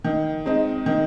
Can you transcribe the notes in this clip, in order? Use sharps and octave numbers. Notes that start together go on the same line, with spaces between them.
D#3
G#3 C4 D#4
D#3